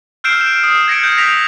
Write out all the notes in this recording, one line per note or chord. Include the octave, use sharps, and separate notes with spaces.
E6 F6 G6 C7 D7 E7
E7
D#6
G#6 A#6 C#7 D7
F#6 G6
A#6 B6 F7